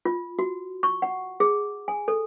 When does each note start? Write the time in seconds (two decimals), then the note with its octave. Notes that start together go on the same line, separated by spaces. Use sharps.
0.05 F4
0.39 F#4
0.83 C#6
1.02 F#5
1.40 G#4
1.88 G#5
2.08 A4